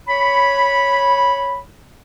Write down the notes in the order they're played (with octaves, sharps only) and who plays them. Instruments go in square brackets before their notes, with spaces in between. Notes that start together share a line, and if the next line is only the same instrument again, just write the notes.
[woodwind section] C#5 B5